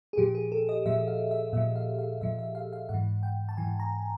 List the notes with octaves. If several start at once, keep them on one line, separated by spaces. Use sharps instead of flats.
G#4
A#2 F3 G4
G#4
A4
D#5
A#2 F3 E5
F5
E5
A#2 F3 E5
F5
F5
A#2 F3 E5
E5
F5
F5
G#2 E3 F#5
G5
A5
G#2 E3 G#5
A#5